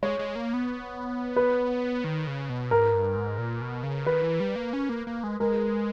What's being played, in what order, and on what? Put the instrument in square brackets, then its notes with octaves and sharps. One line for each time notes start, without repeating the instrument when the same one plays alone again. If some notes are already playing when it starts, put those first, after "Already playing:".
[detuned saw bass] G#3 [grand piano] C#5
[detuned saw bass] G#3
A#3
B3
[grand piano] B4
[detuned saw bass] D#3
C#3
B2
[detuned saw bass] G#2 [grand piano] A#4
[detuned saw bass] G2
G#2
A#2
B2
C#3
[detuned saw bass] D#3 [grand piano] B4
[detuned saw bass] E3
G3
A#3
C#4
A#3
A#3
G#3
[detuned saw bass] G#3 [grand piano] A#4